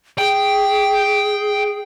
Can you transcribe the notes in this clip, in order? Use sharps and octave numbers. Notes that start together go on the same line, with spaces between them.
G#4 G5